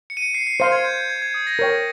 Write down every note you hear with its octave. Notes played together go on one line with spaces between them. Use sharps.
C#7
D#7
C#7
C7
C7
C5 F5 C6 C7
G#6
G6
G6
G#6
G#6
D#6
A#6
A#4 C#5 G5